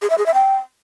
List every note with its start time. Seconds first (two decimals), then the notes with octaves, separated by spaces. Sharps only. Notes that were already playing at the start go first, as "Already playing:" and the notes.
0.02 G#4
0.10 E5
0.18 G#4
0.26 E5
0.34 G5